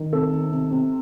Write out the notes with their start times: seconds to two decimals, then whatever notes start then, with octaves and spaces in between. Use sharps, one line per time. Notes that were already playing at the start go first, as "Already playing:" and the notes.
Already playing: D#3
0.13 C3 A4
0.32 D#3
0.52 C3
0.71 C3